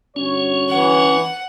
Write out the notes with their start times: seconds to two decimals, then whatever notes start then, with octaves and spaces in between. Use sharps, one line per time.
0.16 G1 C#4 F#4 C#5
0.69 E3 F#5